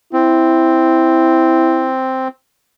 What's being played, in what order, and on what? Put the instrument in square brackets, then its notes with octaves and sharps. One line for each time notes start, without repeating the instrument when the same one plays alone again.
[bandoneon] C4 [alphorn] E4